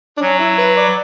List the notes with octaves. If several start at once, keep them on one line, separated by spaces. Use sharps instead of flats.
D4
F#3 C#4
E4
B4
D5